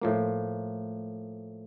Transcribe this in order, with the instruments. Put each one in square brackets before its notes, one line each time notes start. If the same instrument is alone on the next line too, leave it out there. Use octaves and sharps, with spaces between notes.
[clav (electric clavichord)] A2 F3 A#3